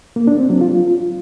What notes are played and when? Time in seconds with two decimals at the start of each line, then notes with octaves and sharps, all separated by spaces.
0.16 A#3
0.27 D4
0.39 C4
0.50 F#3
0.61 F4